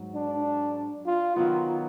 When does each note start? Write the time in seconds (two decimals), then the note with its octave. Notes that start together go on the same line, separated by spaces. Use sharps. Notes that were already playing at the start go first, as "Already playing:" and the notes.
Already playing: G#2 F#3
0.15 D4
1.06 F4
1.36 D#3 F#3 B3 F4